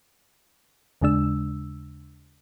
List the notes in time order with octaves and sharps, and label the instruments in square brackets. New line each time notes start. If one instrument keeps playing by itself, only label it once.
[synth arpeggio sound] D#2 C#3 G#3 D4 E6